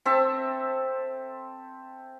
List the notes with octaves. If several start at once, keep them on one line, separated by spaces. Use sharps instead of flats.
C4 A4 E5 A5